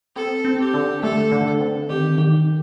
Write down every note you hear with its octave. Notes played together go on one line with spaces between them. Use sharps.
C4 A4
C4
G4
D3
A3 A4
D3
C4
D#3 G4
D#3